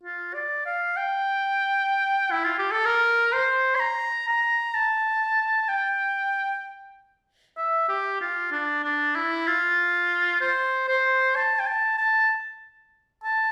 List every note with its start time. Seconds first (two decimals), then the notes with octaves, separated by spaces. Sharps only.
0.03 F4
0.34 D5
0.66 F5
0.97 G5
2.31 E4
2.44 F4
2.59 G4
2.72 A4
2.85 A#4
3.33 C5
3.76 C6
3.80 A#5
4.28 A#5
4.75 A5
5.69 G5
7.57 E5
7.89 G4
8.21 F4
8.52 D4
8.84 D4
9.16 E4
9.47 F4
10.41 C5
10.88 C5
11.36 A5
11.59 G5
11.66 A5
11.98 A5
13.24 A5